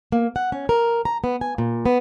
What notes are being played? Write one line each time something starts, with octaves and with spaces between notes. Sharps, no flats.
A#3
F#5
C#4
A#4
A#5
B3
G#5
A#2
B3